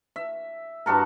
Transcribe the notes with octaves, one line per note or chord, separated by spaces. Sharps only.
E5
G2 F#4 A4 A#4